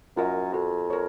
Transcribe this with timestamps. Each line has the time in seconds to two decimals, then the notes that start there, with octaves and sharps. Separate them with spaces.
0.17 F#2 F4 A#4 D#5
0.53 F2 F#4
0.90 A#4 C#5